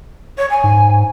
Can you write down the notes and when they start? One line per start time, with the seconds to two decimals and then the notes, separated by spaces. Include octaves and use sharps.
0.38 C#5
0.50 G#5
0.64 G#2